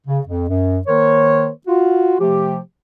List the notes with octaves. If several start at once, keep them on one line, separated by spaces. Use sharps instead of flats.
C#3
F2
F#2
D#3 A#3 A#4 C5 C#5
F4 F#4
C3 F3 A3 G4